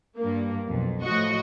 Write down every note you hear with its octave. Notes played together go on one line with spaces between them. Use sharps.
G2 A#3
B1 F2
A2 F3 F#4 D#5 C#6